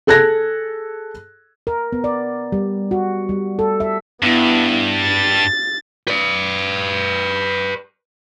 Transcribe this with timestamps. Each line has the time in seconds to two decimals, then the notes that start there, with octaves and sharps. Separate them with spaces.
0.07 G#4 A4 F#6 G#6 A#6
1.67 A#4
1.93 B3
2.04 D5
2.52 G3
2.91 F#4
3.29 G3
3.59 A4
3.80 E5
4.22 G2 B3 E4
4.98 A6
6.08 B4 D5